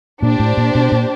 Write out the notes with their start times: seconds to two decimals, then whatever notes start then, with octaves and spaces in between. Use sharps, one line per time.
0.22 A#2 D4 G4 C5
0.40 A2
0.57 A#2
0.75 B2
0.92 A#2